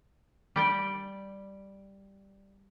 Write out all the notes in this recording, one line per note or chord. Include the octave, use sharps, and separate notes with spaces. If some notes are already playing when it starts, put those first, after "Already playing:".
G3 D5 G5